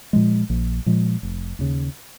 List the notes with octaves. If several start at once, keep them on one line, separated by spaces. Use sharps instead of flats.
A#2 F3 G#3
A#1
A#2 F3 G#3
F1
D#2 C#3